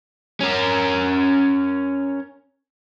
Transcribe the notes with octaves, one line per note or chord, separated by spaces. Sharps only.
C#4 A#4